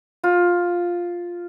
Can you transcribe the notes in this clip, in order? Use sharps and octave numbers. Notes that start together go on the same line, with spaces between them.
F4